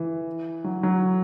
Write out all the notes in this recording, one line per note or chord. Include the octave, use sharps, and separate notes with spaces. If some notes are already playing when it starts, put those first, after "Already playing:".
Already playing: E3
F#3
F#3